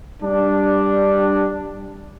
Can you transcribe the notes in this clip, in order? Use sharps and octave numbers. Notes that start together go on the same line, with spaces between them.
G3 D4